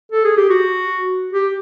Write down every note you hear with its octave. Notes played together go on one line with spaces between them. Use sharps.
A4
G#4
G4
F#4
G4